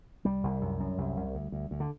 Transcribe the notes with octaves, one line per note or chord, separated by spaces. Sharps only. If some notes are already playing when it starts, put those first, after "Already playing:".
C2 G3
C2
F#2
F#2
C2
C2
D2
D2
D2
D3